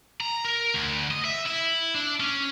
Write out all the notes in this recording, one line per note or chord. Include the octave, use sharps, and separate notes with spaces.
A#5
A#4
D2
D#5
E5
E4
D4
C#4